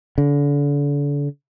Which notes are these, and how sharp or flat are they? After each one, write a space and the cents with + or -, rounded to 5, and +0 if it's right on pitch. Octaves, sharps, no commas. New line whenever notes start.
D3 -35